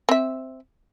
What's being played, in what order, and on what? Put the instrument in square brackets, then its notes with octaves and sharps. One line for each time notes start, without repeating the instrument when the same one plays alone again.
[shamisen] C4 E5